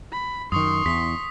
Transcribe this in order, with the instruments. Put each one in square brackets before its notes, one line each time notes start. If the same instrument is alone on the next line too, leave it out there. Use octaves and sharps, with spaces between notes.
[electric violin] B5
[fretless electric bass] F#2 D#3 [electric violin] C6 C#6 [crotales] D#6
[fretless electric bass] E2 [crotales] B6